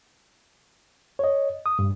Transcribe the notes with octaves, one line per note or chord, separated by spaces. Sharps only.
C#5 D#5
D#6
G2